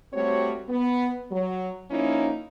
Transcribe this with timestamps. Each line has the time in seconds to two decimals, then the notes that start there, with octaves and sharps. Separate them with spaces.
0.13 G3 A3 C4 F#4 C#5
0.69 B3
1.31 F#3
1.90 F3 A#3 C#4 D#4 E4